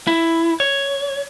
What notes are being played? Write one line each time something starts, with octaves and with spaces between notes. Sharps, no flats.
E4
C#5